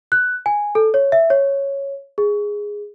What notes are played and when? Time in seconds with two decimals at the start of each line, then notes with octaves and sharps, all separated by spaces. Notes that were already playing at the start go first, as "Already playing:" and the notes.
0.12 F#6
0.46 G#5
0.75 A4
0.94 C#5
1.12 E5
1.30 C#5
2.18 G#4